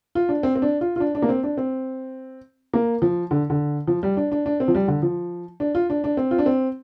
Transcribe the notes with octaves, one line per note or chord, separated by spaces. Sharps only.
F4
D4
C4
C4
D4
F4
F4
D4
D4
A#3
C4
D4
C4
A#3
F3
D3
D3
F3
G3
D4
D4
D4
C4
F3
G3
D3
F3
D4
F4
D4
D4
C4
F4
D4
C4